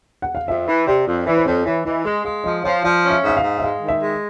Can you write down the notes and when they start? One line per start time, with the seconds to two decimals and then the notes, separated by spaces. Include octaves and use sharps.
0.22 F#5
0.35 F5
0.48 F2 E5
0.67 E3
0.87 C3 D5
1.06 F2
1.26 E3 D5
1.37 C5
1.46 F2 C#5
1.65 E3 C#5
1.85 E3 D#5
2.05 G#3 D#5
2.25 G#3 F5
2.44 F3 D#5
2.64 F3 C#5
2.83 F3 D5
3.04 C#4
3.10 E5
3.23 G#2 E5
3.37 F5
3.42 G#2
3.58 E5
3.62 G#3 F5
3.82 D#3
3.88 E5
4.02 G#3